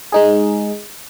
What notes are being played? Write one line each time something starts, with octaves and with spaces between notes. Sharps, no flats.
G#3 D#4 G#4